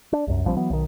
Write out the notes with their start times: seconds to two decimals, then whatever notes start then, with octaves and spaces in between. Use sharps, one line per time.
0.13 D4
0.27 C2 F#2
0.45 A#1 F3 G3 C4
0.57 E3 F#3 B3
0.70 B1 D#3